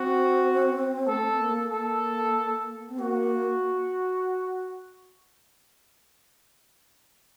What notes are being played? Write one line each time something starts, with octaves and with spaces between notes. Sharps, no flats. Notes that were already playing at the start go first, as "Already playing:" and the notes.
Already playing: C4 F#4
A3 A4
C4
A#3
A#3 A4
C4
A#3 F#4